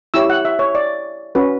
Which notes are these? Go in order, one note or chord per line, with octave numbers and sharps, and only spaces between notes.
E4 G4 C#5 E6
F#5
E5
C#5
D5
C#4 F#4 B4